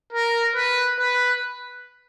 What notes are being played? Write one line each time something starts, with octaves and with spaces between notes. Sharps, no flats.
A#4
B4
B4